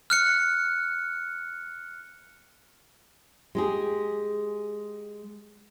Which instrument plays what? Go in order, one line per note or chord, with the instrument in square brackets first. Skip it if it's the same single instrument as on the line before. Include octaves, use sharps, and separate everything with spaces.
[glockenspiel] F6 F#6 C#7
[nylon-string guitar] G#3 G4 G#4